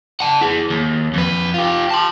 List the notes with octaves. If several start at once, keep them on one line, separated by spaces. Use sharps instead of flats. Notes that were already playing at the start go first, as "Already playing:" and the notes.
F#5 A5
E4 G#4
D#2
F2 B4
F4 G4
A5 C6